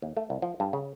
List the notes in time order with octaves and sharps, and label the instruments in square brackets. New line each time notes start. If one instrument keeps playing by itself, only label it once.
[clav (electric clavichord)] D#2
A3
C2
F3
G2
C#3